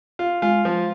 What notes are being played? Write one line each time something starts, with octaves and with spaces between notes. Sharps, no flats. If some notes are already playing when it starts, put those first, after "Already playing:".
F4
G#3 F4
F3